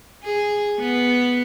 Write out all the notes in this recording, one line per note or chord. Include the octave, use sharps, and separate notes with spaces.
G#4
B3